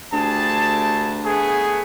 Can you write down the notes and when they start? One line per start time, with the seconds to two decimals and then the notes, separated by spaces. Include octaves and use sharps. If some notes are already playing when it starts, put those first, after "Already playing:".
0.12 D2 G4 G#4 A5
1.24 A3 B3 G#4